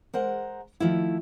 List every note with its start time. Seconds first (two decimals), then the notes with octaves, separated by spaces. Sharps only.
0.14 G#3 A#4 C5 F#5
0.80 D#3 F3 A3 E4